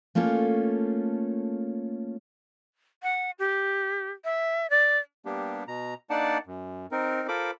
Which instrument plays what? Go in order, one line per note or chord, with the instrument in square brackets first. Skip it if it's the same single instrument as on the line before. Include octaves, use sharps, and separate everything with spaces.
[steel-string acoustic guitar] A3 A#3 C#4 F4 A4
[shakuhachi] F#5
G4
E5
D5
[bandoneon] G3 A#3 B3 D4 G4
B2 A#5
A#3 D4 D#4 D5 F#5 A5
F#2
C4 D#4 A#4
F4 A4 A#4 C5 B5 D6